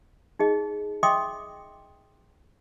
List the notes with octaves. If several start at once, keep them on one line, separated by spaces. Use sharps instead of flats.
D#4 G#4 D#5
D#5 E5 G5 C6 D6 D#6